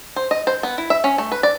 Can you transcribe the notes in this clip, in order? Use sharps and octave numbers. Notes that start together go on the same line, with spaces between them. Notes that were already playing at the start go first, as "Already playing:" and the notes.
C5
D#5
C5
B3
E4
E5
C#4
A3
B4
D5